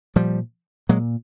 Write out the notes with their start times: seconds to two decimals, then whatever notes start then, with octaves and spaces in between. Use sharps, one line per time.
0.16 A#2 F3 G3
0.89 A#2 F#3 G#3